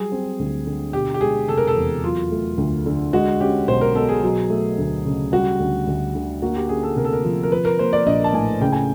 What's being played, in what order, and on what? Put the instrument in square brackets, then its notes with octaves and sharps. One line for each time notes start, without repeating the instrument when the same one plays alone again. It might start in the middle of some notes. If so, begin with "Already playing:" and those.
Already playing: [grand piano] F#3 G3 [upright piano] G#4
[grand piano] C4
D2
D3
[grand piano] B2 [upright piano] G4
[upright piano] G4
[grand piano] G#3 [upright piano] G#4
[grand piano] F1 [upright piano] A4
[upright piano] A#4
A4
[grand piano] E2
[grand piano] F#3 [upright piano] F4
[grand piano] A3
D2
D3
[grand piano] G#3 [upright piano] F#4
[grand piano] C#4 [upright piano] G4
[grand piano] B1 [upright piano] C5
[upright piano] A#4
[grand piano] B2 [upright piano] A4
[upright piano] G#4
[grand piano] F#3
A3
D2
C#3
[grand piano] G3 [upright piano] F#4
[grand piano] D2
D2
D3
[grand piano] A#3 [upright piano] F#4
[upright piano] G4
[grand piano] C#4 [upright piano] G#4
[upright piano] A4
[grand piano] C3 [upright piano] A#4
[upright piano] A4
A#4
[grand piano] F3
[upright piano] A#4
[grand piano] F3 [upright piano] B4
[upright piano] A#4
[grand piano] A#3 [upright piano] C5
[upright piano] D5
[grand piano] A#1 [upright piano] D#5
[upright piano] A5
[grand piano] A2 [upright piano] G#5
[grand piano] C#3 [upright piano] G5
[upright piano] G#5